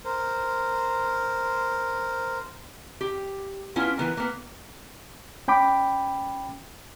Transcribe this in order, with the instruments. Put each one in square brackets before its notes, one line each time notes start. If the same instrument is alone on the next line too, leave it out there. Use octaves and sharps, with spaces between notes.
[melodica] A#4 C5
[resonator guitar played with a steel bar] G4
B3 C#4 D4 E4 F4
E3 B3 A#4
A#3 B3
[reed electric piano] C#4 G5 B5 D6